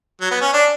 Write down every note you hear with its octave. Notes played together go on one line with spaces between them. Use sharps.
F#3
B3
C#4
D4